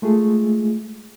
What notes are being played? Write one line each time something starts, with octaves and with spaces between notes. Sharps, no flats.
G#3 A3 F4 G#4